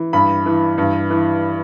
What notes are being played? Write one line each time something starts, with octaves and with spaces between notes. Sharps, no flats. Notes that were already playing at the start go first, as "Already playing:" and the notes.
Already playing: E3
G2 B5
E3
G2
E3